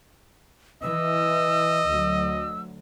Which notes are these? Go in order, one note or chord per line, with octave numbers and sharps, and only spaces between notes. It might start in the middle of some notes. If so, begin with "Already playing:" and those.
E3 D#5 E6
D2 F#3